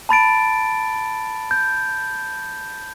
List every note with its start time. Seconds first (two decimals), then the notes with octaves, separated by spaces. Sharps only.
0.09 A5 B5 A6 D7
1.51 G6